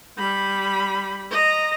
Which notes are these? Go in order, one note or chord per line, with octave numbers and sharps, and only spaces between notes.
G3 B5
D#5 A#5